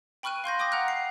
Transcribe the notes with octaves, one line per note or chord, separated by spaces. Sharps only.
G5 B5 C#6 F6 F#6 D#7
F5 C6 G6 A#6
G5 D6 D#6 G6 A#6
F#5 A#5 F6 F#6
C7